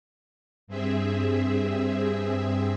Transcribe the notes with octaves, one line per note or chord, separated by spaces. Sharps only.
G2 C4 G#4 E5